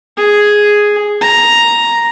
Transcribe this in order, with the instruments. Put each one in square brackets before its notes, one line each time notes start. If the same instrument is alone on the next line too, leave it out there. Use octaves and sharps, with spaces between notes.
[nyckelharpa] G#4
A#5